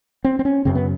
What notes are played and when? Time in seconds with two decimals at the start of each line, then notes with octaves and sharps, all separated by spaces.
0.24 C4
0.39 C4
0.45 C#4
0.65 F#2 C#3 C4
0.75 B3